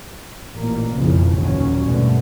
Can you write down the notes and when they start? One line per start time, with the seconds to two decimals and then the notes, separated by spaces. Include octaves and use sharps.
0.55 A1 A#2 A#3
0.97 F#1 B1 F2 C#3 E3 F3
1.33 F#1 D#2 A#2 F#3 C#4
1.86 A#1 G2 B2 D3 A3